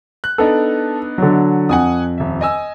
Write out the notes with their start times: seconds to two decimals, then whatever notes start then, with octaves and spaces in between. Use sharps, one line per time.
0.24 F#6
0.38 B3 D4 D#4 A4
1.18 D3 F#3
1.69 F2 F#5 G#5 D#6
2.18 D#1 E5
2.41 D#5 G#5 E6